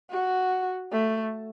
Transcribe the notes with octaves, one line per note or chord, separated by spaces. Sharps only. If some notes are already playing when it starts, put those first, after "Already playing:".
F#4
A3